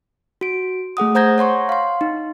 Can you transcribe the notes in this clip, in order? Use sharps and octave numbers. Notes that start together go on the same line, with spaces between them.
F#4 D7
A3 G#4 F#5 D#6
C5 F#5 A#5 G6 G#6 A#6
C#5 F#5 C6 C#6
F5 C6
D#4